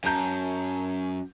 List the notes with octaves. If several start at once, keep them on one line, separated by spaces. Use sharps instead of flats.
F#2 A5 A#5 G6